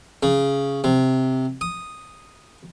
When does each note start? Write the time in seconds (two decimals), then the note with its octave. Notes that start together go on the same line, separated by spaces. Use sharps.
0.23 C#3
0.84 C3
1.61 D#6